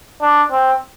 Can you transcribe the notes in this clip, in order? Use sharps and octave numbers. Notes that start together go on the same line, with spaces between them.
D4
C4